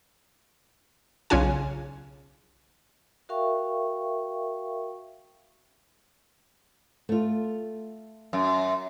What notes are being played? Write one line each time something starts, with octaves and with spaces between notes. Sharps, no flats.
B1 C#3 C#4 F4 G#5
F#4 A#4 E5 F5 G5 C#6
A3 F4
F#2